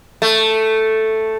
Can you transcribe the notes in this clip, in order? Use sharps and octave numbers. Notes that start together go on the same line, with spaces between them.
A3